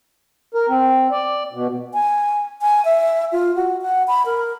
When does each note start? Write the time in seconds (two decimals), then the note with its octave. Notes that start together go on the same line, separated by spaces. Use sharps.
0.55 A#4
0.69 C4
1.11 D5
1.53 B2
1.94 G#5
2.62 G#5
2.85 E5
3.32 F4
3.55 F#4
3.81 F#5
4.08 B5
4.26 A#4